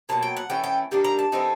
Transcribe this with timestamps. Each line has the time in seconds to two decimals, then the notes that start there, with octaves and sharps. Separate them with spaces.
0.09 B2 F#3 A#3 A5
0.23 G5
0.37 F#5
0.50 E3 A3 C#4 G5
0.64 G5
0.91 D#3 G3 A#3 D4
1.04 A#5
1.19 A5
1.32 E3 A3 C4 D#4